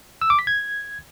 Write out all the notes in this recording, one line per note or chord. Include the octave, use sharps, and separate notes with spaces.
E6
D6
B6
G#6